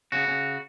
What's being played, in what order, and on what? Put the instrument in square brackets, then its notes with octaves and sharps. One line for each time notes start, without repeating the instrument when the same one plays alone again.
[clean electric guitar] C#3 F#4
C#3